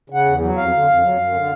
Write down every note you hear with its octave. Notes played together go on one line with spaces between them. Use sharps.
C#3 F#5
E2
F#3
F2 F5
D3
F2
F#3
F#2
D3